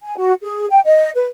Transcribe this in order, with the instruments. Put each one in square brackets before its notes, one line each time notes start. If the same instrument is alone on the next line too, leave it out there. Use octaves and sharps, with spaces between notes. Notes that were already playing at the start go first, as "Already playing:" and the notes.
[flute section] G#5
F#4
G#4
G5
D#5
B4